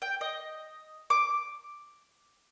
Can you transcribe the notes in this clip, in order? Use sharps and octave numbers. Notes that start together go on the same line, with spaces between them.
G5
D#5
D6